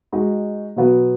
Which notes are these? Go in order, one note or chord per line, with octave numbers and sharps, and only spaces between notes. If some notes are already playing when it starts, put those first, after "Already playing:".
G#3 D#4 F#4
B2 F#3 B3 F#4 B4